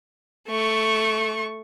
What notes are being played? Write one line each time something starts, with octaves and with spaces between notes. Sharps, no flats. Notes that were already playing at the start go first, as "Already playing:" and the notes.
A3 C#6